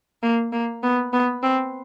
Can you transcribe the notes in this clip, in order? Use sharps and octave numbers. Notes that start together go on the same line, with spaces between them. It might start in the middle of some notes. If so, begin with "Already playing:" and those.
A#3
A#3
B3
B3
C4